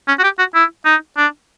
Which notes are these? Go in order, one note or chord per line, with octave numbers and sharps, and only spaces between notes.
C#4
F#4
G4
F#4
E4
D#4
D4